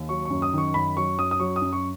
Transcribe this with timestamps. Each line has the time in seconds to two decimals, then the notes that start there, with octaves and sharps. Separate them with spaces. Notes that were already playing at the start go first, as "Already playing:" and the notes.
Already playing: D#2
0.09 F#3 C#6
0.25 F#2 C#6
0.42 D#6
0.53 D#3 C#6
0.74 F#2 B5
0.97 F#3 C#6
1.18 F#2 D#6
1.31 D#6
1.40 F#3 C#6
1.56 D#6
1.61 F#2
1.73 C#6